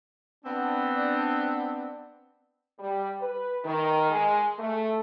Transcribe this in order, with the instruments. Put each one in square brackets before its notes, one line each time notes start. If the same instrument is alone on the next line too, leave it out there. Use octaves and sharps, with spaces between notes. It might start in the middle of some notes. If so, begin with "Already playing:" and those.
[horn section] B3 C4 D4
[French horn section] G3
B4
D#3
G#3
A3